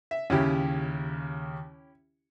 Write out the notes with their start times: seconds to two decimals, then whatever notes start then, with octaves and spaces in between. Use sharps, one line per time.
0.11 E5
0.30 D#2 C#3 C#4 E4 G4